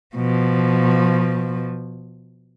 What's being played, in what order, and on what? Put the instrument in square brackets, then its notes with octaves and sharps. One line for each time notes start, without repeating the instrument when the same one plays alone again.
[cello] B2 F3